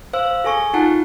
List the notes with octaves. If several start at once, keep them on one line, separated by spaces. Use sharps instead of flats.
C5 F5 E6
G#4 A4 G#5 C#6
D#4 F4 F#5 A5